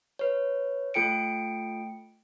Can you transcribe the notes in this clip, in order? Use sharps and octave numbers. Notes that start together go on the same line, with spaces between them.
B4 C#5
A3 F4 A4 G5 C#7 D7